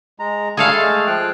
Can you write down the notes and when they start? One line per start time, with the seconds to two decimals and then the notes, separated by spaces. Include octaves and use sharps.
0.19 G#3 A#5
0.57 G3 A3 G#4 A4 F5
0.76 G#3 A3
1.07 F3 G5 F#6